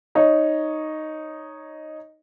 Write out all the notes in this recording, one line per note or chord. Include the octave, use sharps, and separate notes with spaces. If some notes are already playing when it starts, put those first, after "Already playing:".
D#4 C#5